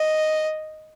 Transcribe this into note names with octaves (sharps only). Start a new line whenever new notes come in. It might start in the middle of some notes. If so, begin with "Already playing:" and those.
Already playing: D#5